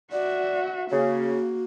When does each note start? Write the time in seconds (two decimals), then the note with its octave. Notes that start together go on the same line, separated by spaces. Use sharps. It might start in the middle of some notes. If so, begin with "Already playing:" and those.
0.12 F#4 D5 E5
0.91 C#3 A#3 F#4